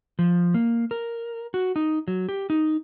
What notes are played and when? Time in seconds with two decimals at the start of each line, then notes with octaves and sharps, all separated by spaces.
0.19 F3
0.54 A#3
0.91 A#4
1.54 F#4
1.76 D#4
2.08 F#3
2.29 G4
2.50 D#4